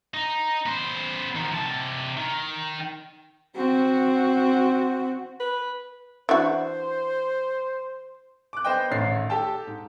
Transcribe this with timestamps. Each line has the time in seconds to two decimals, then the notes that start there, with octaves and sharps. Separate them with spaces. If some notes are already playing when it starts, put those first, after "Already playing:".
0.14 D#4
0.66 B3 C5
1.35 D#3 F3
1.51 C3 A5
2.17 D#3
3.55 C4 F#4
5.40 B4
6.29 E3 D4 F#4 C5
8.53 D6 F#6
8.65 B3 C5 D#5 G5
8.91 A1 D#3 A3 C#5 A6 C7
9.30 G4 A4 G5 A5
9.67 G#2